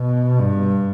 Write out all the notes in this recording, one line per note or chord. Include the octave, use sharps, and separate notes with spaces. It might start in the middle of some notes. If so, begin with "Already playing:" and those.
Already playing: B2
G2